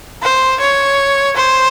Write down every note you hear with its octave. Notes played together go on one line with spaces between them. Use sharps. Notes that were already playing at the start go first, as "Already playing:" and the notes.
C5
C#5
C5